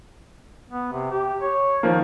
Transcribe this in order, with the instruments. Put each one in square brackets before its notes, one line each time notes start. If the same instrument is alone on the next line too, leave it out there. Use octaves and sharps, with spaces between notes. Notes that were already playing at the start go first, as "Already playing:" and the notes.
[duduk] B3
C3
G4
C#5
[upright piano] D#3 F3 A#3